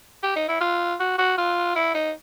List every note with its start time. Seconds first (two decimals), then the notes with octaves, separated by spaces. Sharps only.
0.23 G4
0.36 D#4
0.48 E4
0.61 F4
1.00 F#4
1.18 F#4
1.38 F4
1.76 E4
1.95 D#4